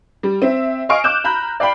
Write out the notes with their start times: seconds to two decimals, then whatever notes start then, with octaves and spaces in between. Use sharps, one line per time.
0.23 G3
0.42 C4 E5
0.89 D#5 F5 G#5 C#6 F6 D7
1.04 D6 F#6 G6 E7
1.24 A#5 B5 G6
1.60 D5 F5 G5 B5